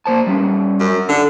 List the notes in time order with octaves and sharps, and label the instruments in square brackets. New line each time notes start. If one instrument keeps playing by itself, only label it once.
[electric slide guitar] A#3 C5 A5
G3 C#4
[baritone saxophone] F#2
D3